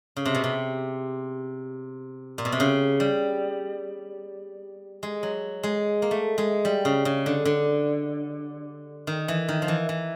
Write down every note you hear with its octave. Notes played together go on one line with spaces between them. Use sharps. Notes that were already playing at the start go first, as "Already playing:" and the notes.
C#3
C3
B2
C3
A#2
B2
C3
C#3
G3
G#3
F#3
G#3
A#3
A3
G#3
G3
C#3
C#3
D3
D3
D#3
E3
D#3
F3
E3
E3